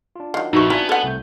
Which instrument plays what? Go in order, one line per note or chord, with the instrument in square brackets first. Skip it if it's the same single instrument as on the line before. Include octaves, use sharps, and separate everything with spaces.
[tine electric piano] D4 F4
[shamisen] D#3 F#3 [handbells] F5
[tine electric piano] A#1 B4 E5 [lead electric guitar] F2 [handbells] D#4 F#4 C#6
[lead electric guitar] B3 [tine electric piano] D4 G#5 [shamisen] E4 F4 [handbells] A#5
[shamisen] A4 F#5
[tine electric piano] C2 A3 G6